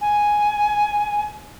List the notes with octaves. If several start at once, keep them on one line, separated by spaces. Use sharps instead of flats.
G#5